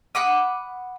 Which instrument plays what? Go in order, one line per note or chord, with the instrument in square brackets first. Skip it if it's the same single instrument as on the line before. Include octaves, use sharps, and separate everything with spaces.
[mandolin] F#5 B5 D6 D#6